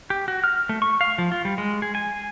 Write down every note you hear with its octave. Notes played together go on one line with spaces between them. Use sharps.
G4
F#4
F6
A3
C#6
F5
F3
F4
G3
G#3
G#4
G#5